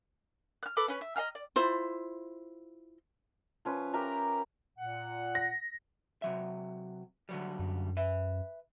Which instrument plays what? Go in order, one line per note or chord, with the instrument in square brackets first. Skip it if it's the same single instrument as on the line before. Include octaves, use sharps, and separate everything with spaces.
[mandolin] F6 F#6
A4 B4 B5 D6
C#4 B4
E5
D#5 F#5 A#5 F6
D5
[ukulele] E4 F4 C5
[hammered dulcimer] F3 C#4 B4 E5
G4 A#4 E5 A#5
[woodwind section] A#2 F#5
[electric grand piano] A#6
[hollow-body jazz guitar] C3 F#3 E5
D3 F#3 G3
[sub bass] F#2
[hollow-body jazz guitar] B4 E5